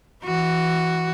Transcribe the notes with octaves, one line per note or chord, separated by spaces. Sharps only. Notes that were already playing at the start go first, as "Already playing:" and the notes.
E3 F#4